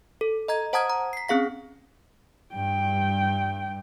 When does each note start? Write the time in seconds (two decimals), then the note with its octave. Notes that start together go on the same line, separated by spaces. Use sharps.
0.21 A4
0.48 D#5 A#5 G#6
0.73 C5 F#5 A5 A#5 D#6 G#6
0.90 A#5
1.13 B6 C7
1.28 C4 C#4 G#4 F5 B6
2.54 G2 G5